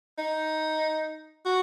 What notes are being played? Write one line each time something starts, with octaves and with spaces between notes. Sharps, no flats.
D#4
F#4